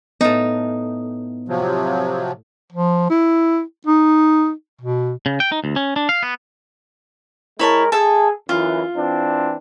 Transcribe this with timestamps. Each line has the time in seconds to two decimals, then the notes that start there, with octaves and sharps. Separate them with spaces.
0.21 A2 B3 D#4
1.49 C3 F3 F#3
2.72 F3
3.10 E4
3.87 D#4
4.81 B2
5.26 C#3
5.40 G5
5.52 D#4
5.64 D2
5.76 C#4
5.96 D4
6.09 F5
6.23 B3
7.59 G#3 E4 A#4 C#5 A5
7.92 G#4 A4 E5 A5
8.49 F#2 E3 F4
8.95 E3 C4 D4